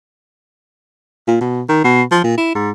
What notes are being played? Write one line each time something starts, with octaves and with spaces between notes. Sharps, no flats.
A#2
B2
D#3
B2
F3
A#2
E4
G#2